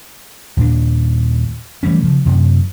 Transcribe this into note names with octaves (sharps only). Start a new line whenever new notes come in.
D#2 A#2 D4
E3 G3 A3 C#4
C#3 F3
F#2 C3